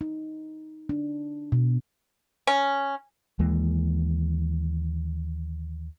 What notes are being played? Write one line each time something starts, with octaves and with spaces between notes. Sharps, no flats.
D#4
D4
B2
C#4
D#2 E3 G#3 A#3